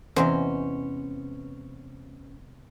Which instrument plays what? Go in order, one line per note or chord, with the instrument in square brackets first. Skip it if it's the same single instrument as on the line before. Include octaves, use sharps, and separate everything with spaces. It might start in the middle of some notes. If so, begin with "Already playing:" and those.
[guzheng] E2 C3 G#3 [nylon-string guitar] C#4 B4 C5